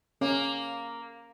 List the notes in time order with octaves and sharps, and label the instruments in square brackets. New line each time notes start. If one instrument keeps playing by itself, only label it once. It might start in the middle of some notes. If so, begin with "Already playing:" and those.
[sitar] A#3 [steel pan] C#4